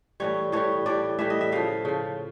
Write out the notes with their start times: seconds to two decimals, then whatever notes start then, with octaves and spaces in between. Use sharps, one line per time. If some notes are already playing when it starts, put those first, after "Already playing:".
0.20 A2 E3 G3 C#5
0.52 A2 E3 G3 C#5
0.86 A2 E3 G3 D5
1.19 A2 E3 G3 E5
1.30 D#5
1.41 E5
1.52 C#3 F3 F5
1.85 C#3 F3